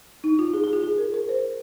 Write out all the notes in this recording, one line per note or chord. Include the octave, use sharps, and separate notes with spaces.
D#4
F4
G#4
G#4
F4
G#4
A#4
A#4
C5